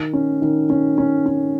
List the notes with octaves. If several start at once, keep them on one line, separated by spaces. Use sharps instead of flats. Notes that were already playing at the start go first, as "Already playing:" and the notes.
Already playing: D#3
C#4
D#3
C#4
C#4
C#4